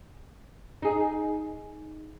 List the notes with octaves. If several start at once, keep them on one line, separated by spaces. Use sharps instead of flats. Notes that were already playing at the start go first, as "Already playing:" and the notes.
D#4 G#4